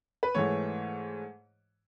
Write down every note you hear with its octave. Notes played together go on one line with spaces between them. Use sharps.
B4
G#2 E3 A3 C#5